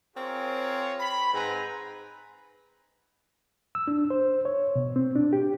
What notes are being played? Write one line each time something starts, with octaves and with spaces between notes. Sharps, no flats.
C4 F4 G#4 A#4 C5 C#5
B5
G#2 C4 B4 F#5 G#5 A#5
E6
D4
C5
C#5
B2
C4
D4
G4